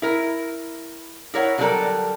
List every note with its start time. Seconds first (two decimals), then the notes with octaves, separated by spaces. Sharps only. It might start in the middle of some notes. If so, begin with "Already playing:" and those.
0.02 E4 A#4
1.34 E4 A#4 C#5 F#5
1.58 D3 F#3 G3 D4 A4 A#4